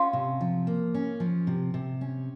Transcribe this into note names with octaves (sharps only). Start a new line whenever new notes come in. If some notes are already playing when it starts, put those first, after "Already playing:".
Already playing: C#4 F4
C3
F3
A#3
C#4
F3
C3
C3
C#4